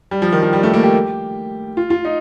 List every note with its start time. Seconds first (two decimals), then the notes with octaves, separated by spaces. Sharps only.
0.11 G3
0.22 F3
0.32 D#3
0.43 F3
0.53 G3
0.63 A3
0.74 A#3
0.84 G4
1.77 F4
1.90 F4
2.05 D#4